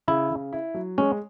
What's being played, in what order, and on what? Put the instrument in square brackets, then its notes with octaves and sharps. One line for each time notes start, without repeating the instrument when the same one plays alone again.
[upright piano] C#3 [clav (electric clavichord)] E4
[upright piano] C#3
E4
F#3
[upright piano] G#3 [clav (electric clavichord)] C#4